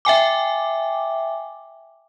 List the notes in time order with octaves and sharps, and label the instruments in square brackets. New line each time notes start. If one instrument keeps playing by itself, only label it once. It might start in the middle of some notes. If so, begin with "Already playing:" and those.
[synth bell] E5 G5 G#5 D6